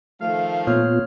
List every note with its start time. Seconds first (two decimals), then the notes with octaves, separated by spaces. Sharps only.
0.21 D#3 F3 A3 F5
0.67 A#2 A#3 B3 F4 C#5 F6